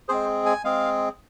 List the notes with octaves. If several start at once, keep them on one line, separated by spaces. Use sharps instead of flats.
G#3 C4 G#4 C5
G#5
G#3 C4 G#4 F5